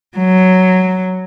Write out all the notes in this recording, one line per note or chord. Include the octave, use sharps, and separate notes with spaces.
F#3